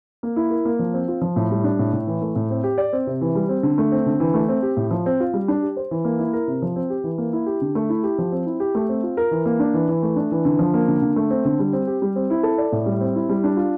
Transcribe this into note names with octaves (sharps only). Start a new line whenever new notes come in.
A#3
E4
A#4
A#3
F3
C4
F4
F3
A2
G3
D4
A2
A2
E3
A3
A2
C4
G4
D5
C4
C3
E3
G3
C4
D3
A3
C4
D3
E3
A3
C4
G4
A2
F3
C4
F4
G3
D4
G4
C5
E3
A#3
E4
A#4
C3
F3
C4
G4
E3
A#3
E4
G4
D3
A3
E4
G4
F3
C4
E4
G4
A3
C4
F4
A#4
E3
A#3
D4
E3
E3
A3
D4
E3
D3
F3
A#3
D3
D3
A3
C4
D3
G3
C4
G4
G3
C4
E4
A4
D5
A2
G3
C4
E4
G3
D4
F4